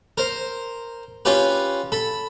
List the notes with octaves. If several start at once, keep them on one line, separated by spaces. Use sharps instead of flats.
A#4 C5
C#4 F4 G4 B4
A4 B5